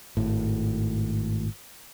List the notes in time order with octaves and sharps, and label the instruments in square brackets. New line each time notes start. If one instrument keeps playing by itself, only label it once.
[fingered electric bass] G#1 A2